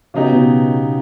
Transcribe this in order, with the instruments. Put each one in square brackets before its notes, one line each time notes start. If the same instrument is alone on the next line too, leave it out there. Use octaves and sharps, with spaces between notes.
[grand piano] C#3 F#3 B3 D#4 G4
[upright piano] B2